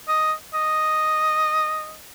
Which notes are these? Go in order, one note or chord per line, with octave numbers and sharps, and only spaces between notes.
D#5
D#5